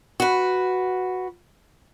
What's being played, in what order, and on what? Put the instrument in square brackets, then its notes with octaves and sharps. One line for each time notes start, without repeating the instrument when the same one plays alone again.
[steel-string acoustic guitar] F#4 B4